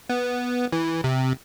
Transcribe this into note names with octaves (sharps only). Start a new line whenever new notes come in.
B3
E3
C3